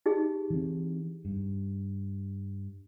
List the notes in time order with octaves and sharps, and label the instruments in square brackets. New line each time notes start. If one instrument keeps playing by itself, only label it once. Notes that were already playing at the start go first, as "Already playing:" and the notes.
[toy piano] D#4 G4 G#4
[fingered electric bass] E3 C4
G2